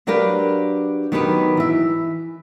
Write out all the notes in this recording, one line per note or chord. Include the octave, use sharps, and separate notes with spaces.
F#3 D4 G4 A#4 B4 F5
D#3 F#3 B3 D#4 G4 B4
E3 E5